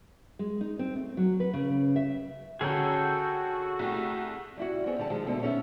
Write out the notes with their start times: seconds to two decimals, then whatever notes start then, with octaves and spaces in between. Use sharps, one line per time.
0.39 G#3
0.61 D#4
0.79 C4
0.96 A3
1.17 F#3
1.40 B4
1.53 C#3
1.96 E5
2.61 D3 C#4 F#4 G#4 A4 G5 A#5
3.79 C2 A3 G4
4.57 G3 E4 F#4
4.86 B3 C4 G#4 C#5
4.98 D3 G3 D5 A5
5.10 D#3 F3 G#3
5.26 D2 B2 D3 C4 A4
5.42 B3 C#4 D#4 D5 E5